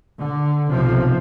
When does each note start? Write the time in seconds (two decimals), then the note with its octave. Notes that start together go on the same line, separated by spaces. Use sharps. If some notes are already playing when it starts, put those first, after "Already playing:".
0.20 D3
0.71 B1 C3 F3